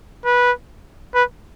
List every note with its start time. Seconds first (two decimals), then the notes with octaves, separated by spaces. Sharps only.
0.25 B4
1.14 B4